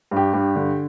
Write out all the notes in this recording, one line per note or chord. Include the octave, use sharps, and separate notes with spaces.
G2
G4
G2
D3